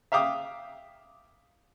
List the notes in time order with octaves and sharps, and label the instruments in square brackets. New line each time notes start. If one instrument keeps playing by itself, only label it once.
[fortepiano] E5 F5 G5 D6 D#6